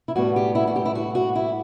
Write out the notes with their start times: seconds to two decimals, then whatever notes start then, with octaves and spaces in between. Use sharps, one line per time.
0.08 E4
0.16 A2 G3 B3 F#4
0.36 G4
0.55 E4
0.67 F#4
0.76 G4
0.85 E4
0.95 F#4
1.15 F#4
1.35 E4